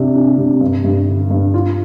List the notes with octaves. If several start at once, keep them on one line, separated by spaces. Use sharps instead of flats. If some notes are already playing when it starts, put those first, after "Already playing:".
Already playing: C3 D4
D4
C3
G2
G2
D3
G2
F4